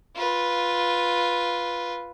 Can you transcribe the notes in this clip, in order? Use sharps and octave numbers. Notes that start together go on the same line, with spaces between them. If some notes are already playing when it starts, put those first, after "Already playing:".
F4 B4